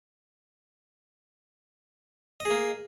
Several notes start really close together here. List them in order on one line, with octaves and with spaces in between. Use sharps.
D#5 G#4 A#3